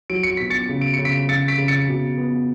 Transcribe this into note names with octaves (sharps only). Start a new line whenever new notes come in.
F#3 D7
C#7
B2 B6
A6 C#7
C#3
D7
C#3 C#7
B6 D7
C#3 A6 C#7
B6 D7
C#3
A6 C#7
B2
B3